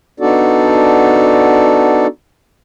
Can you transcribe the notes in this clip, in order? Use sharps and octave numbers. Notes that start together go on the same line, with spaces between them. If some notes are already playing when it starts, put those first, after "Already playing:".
B3 D4 D#4 F#4 A4 D5